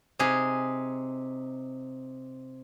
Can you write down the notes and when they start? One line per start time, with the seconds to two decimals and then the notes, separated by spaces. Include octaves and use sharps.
0.19 C3 D#4 G#4